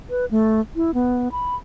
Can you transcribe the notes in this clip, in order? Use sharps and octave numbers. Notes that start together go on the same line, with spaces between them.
B4
A3
E4
B3
B5